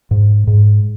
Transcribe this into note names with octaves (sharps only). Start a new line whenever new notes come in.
G#2
G#2